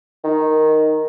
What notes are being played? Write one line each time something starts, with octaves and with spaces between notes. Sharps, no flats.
D#3